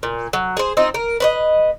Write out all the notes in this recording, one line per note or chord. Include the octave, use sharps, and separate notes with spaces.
A#2
F#3
G#4 C5
C4 D#4 F4
A#4
B4 C5 D#5